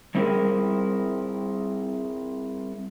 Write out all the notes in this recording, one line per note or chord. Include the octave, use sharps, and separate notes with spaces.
G3 C4 E4 G#4 A#4